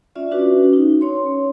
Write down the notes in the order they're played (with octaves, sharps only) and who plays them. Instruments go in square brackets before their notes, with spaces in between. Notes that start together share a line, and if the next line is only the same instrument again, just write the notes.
[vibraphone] C#4 F4 D5 E5
C#4 D4 F#4 B4
D#4
C#4 C#5 C6